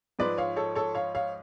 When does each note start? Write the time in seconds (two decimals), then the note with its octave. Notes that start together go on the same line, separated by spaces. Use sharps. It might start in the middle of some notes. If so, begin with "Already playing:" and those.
0.19 G#2 F3 G#3 B4 D5
0.38 C#5 F5
0.56 A4 C#5
0.75 A4 C#5
0.95 C#5 F5
1.15 C#5 F5